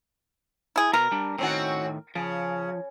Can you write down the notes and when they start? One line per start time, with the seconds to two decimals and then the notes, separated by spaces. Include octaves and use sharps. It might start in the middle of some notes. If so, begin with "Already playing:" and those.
0.76 E4 G#4
0.94 B2 A#4 A#5
1.11 G3 D4
1.38 A2 D#3 C4 C#4 F#4
2.15 C#3 F3